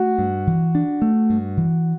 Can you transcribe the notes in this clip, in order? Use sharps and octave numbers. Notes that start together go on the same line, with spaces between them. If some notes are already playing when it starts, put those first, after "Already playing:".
Already playing: A3 F#4
G2
E3
D4
A3
G2
E3